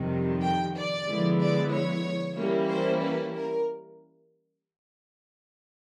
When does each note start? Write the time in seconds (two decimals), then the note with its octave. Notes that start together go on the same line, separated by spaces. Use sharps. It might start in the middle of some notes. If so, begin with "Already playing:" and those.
Already playing: F2 C3 D#3 G3
0.42 G5
0.75 D5
1.06 D3 F3 G#3 B3 E4
1.40 D5
1.72 C#5
2.37 E3 G3 A#3 C#4 E4
2.69 C5
3.02 B4
3.34 A#4